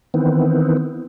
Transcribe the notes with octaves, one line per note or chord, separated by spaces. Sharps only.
D#3 E3 B3 C4